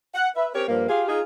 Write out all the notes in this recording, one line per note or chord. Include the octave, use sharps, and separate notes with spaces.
F#5
B4 E5
C4 G4 A#4 C#5
G2 F3 A#3
F4 G4 G#4 F5
D#4 F4 G#4